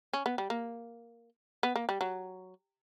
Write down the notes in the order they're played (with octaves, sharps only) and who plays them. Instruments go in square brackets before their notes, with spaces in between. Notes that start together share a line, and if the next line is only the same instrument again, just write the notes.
[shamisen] C#4
B3
G3
A#3
B3
A#3
G3
F#3